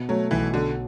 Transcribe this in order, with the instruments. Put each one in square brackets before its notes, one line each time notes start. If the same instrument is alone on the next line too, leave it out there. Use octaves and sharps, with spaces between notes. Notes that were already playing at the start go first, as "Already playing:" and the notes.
Already playing: [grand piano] B2
[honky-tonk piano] F#3 [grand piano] A3
[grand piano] B1 [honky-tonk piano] E3
[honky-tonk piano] D3 [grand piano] F#3